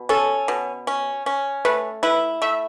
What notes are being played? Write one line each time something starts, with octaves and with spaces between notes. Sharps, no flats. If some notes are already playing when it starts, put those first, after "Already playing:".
Already playing: B2
C#4 A4
B2
C#4
C#4
A3 B4
E4 B4
A3 E5